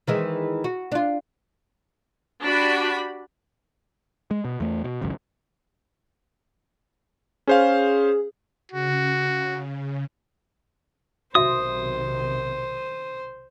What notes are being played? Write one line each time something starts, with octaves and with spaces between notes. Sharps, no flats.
D#3 E3 G#3
F#4
D4 F4
D4 F#4 G4 B5
G#3
B2
E2 A3
B2
G#1 C#2 F#2
C#4 G#4 C5 F5
C#3 F#4
B1 C3 D#3 F#4 C5 D#5 E5 D#6